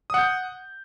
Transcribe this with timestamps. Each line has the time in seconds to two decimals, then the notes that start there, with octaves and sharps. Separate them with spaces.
0.10 D#6
0.14 F#5
0.18 G6